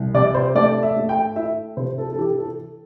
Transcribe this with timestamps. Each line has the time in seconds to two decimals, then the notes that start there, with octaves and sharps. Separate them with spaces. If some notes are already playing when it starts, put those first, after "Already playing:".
Already playing: C2
0.14 C3 D5
0.34 C5
0.55 A3 D5
0.83 E5
0.96 A3
1.09 G5
1.36 E4 E5
1.77 C3 C5
1.98 A4
2.13 A4
2.18 E3 G4
2.38 A4